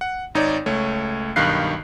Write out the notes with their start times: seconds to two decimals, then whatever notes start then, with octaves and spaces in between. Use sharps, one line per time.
0.01 F#5
0.35 G#1 D#4 C#5 D5
0.66 C#2 A3 C#5
1.36 B1 G2 D#3 F5 F#6 C7